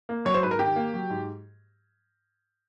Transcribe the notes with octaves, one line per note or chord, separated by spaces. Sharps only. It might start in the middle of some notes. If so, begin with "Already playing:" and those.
A#3
F#3 C#5
C5
G#2 B4
A#4
D#3 G4
A#3
F#3
G#2